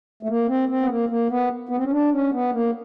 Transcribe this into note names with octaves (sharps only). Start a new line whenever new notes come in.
A3
A#3
C4
C4
B3
A#3
A#3
B3
B3
C4
C#4
D4
C#4
B3
A#3